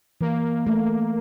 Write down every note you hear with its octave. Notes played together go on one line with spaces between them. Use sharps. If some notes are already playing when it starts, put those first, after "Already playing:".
E3 A#3
A3 A#3